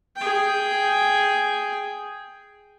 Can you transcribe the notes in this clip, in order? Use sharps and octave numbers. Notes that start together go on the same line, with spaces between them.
G#4 G5